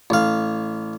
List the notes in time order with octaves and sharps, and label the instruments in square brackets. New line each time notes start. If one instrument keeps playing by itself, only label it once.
[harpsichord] A1 F5